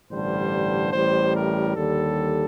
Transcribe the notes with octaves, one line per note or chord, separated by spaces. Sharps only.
A1 G2 D3 G3 C5
A1 A2 G3 C5
A#4
D#2 D3 G3 A4